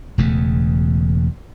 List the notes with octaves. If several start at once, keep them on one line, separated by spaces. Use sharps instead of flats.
E1 E2 C#3 A3